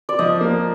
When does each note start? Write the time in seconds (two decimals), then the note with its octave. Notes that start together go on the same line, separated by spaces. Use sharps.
0.09 D5
0.19 F3 D#5
0.41 A#3